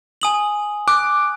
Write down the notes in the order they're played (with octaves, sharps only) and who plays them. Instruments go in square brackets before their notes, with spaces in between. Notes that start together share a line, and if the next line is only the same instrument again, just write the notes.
[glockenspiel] G#5 D#6 F#7
[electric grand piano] D6 [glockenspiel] F#6